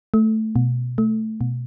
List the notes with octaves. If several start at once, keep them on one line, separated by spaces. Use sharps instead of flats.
A3
B2
A3
B2